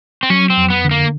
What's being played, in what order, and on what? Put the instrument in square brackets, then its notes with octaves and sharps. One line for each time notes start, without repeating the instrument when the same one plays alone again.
[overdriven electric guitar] C4
[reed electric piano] F#3 [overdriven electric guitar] C#4
[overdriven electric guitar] C4
[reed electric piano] F2
[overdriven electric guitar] B3
[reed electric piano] D3
[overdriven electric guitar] A#3